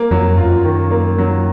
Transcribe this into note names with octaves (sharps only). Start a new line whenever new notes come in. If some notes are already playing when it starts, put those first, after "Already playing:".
Already playing: A#3
F2 F#3
F#2 F4
D#3
A#3
F#3